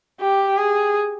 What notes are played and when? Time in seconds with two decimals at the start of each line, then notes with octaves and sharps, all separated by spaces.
0.21 G4
0.58 G#4